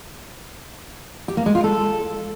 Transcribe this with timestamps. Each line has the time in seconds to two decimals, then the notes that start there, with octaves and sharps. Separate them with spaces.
1.28 G4
1.37 A#3
1.46 G#3
1.55 F4
1.64 A4